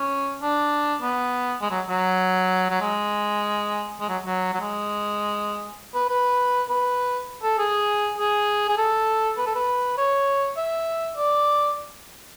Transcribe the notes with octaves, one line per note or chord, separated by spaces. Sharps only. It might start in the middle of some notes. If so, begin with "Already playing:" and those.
Already playing: C#4
D4
B3
G#3
F#3
F#3
F#3
G#3
G#3
F#3
F#3
F#3
G#3
B4
B4
B4
A4
G#4
G#4
G#4
A4
B4
A4
B4
C#5
E5
D5